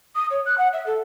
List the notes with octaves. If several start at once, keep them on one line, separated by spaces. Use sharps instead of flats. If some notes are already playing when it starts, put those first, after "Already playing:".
D#6
C#5
F#6
F#5
E5
A4